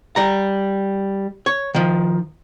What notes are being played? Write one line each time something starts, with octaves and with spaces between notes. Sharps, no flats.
G3 A#5
C#5
D#3 F3